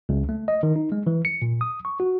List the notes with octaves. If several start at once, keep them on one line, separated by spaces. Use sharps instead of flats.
C#2
A3
D#5
D#3
D#4
G#3
E3
C#7
A#2
D#6
C#6
F#4